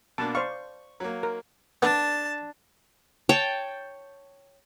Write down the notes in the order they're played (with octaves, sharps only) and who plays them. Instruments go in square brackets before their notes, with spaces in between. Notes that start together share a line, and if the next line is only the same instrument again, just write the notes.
[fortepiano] B2 A#3 D4 [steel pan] A5
[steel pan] C5 D5 F5 [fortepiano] C#6
[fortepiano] F#3 A#3
[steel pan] A#4
[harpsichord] B3 [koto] D4 [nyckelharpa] A5
[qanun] C#5 G5 A5